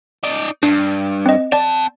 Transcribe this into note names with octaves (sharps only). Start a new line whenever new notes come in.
D#4 D5
G2 D4
C4 D#5
C4 D5 A5